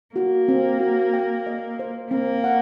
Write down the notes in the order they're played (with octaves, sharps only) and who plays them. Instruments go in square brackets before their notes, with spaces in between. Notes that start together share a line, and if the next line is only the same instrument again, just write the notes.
[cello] A#3 [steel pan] F#4
[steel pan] C4
F#4
G5
D#5
C5
[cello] A#3 [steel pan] C4
[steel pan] F#5